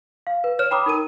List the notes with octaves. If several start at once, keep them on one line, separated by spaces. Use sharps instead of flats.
F5
B4
C#5 F6 E7
G5 A#5 B5 D6 D#6
D#4 A#4 D#7